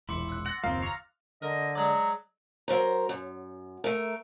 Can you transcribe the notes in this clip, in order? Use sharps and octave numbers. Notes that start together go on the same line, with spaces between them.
E1 A#1 E2 E4 C6 D6 C#7
E6 F#6
F#5 A6 A#6
F#1 D#2 F3 A#3 C4 F5
C#5 A#5
D3 A#4 D#5
F#3 G#3 D5
F#3 A#4 C5 A#5
F#2
A3 A#4